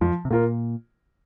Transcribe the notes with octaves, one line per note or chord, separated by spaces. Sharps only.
F2 F3
C3
A#2 A#3 F4 A#4